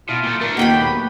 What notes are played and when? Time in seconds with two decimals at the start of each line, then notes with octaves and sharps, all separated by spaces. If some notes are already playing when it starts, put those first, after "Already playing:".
0.09 B2 E4 F4
0.23 A#2 A3
0.41 A3 D4 A#4
0.57 D#2 A#3 D#4 F#4 G4 G5 B5
0.81 F#3 A3 B3 B4